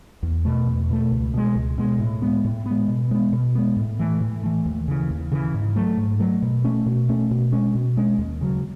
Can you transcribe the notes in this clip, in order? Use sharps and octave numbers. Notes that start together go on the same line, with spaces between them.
E2
B2 A3
E2
B2 A3
C#2
B2 G#3
C#2
B2 G#3
A2
G#3 B3
A2
B3
G#3
B2
G#3 B3
B2
G#3 B3
A2
E3 A3
A2
E3 A3
D#2
C#3 E3
D#2
C#3 E3
G#2
F#3 A3
G#2
F#3 A3
B2
A3 C#4
B2
A3 C#4
B2
G#3 C#4
B2
G#3 C#4
D#2
C#3 F#3